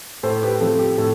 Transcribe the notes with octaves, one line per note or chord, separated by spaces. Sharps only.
A2 A4 C5
G4 B4
F3 A3 C4 A4
G4
A2 A4